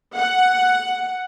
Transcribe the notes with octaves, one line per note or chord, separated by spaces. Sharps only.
F#5